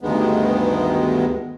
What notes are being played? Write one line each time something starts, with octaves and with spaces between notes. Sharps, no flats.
D2 G2 D#3 G#3 B3